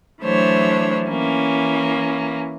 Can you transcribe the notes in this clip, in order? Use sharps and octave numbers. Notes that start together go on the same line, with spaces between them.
E3 F#3 A3 D4 C5 C#5
E3 A#3 C#4